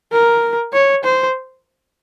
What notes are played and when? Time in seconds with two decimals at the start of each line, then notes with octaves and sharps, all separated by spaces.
0.12 A#4
0.73 C#5
1.04 C5